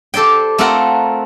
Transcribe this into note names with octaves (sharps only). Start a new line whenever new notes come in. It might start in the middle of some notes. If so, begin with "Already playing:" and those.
G4 A4 C5 D5 G5
A3 C4 F4 A4 A#4 F#5